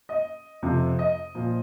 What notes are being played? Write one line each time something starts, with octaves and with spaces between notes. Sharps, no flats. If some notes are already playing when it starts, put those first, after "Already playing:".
D#5
F2 C3 F3
D#5
A#2 F3